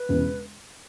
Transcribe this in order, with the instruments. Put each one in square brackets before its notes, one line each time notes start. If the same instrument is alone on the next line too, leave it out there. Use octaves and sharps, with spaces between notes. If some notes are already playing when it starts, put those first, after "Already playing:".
Already playing: [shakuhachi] B4
[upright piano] E1 E2 C#3 G#3 B3